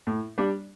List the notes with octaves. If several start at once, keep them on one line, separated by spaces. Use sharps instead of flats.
A2
G3 D4